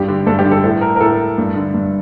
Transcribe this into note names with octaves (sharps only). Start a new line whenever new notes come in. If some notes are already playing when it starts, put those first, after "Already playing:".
Already playing: G2 G4
D3
G2 A4
G4
D3
A4
A2 A4
A#4
A#4
A2 A4
G2
D3
G2